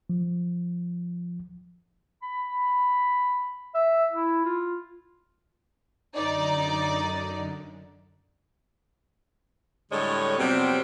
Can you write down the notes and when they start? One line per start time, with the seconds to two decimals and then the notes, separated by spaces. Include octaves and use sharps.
0.10 F3
2.23 B5
3.75 E5
4.12 E4
4.45 F4
6.15 F#2 D3 D#4 D5
9.92 A2 D3 G3 G#3 C#5
10.38 F2 C3 F#3 G3 B3 C4